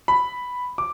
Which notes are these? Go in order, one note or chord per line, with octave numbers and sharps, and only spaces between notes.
B5
D6